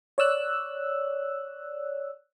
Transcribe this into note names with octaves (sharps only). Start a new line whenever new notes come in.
C#5 D5 E6 F#6